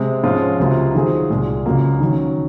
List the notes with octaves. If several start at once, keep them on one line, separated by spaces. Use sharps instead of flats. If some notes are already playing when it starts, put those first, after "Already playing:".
Already playing: C3 G#3
G#2 F3 G#3 C#4 F4
C#2 C3 F#3 A#3 F4
D#3 F#3 C4 F4 G#4
C2 A#2 G#3
C#2 C#3 F#3 A#3 F4
D#3 F#3 C#4